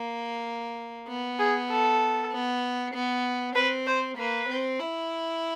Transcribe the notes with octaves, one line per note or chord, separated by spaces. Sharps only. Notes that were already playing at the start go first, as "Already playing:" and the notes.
Already playing: A#3
B3
G#4
A4
B3
B3
C4 B4
C5
A#3 B4
C4
E4